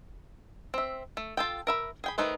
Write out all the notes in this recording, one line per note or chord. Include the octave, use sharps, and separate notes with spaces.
C4 E5
A3
F4 A4 G5
A#4 E5 B5
G#4 G5 B5
D#3 A3 D#4 B4 C5